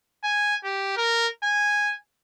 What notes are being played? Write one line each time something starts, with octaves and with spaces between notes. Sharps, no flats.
G#5
G4
A#4
G#5